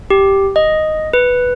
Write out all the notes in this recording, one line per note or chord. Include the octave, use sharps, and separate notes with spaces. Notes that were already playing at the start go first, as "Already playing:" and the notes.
G4
D#5
B4